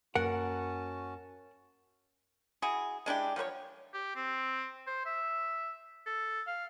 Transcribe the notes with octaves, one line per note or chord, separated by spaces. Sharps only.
F#2 F#3 A#3 C#4 F#4 A#4 F#5 A5
E4 F#4 G#4
G#3 D4 E4 G4
F3 F#3 B4 C#5
G4
C4
C5
E5
A4
F5